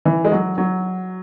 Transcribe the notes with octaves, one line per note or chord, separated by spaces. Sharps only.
E3
G#3
F#3
F#3